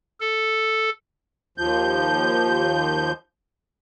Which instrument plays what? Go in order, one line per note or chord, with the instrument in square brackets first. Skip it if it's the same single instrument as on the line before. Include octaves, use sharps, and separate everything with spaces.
[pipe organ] A4
[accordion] D#2 F3 G6